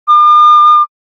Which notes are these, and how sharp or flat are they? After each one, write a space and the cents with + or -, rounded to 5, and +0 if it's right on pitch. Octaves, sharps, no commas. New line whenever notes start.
D6 +45